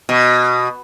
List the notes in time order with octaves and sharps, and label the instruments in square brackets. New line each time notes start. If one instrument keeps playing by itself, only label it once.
[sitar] B2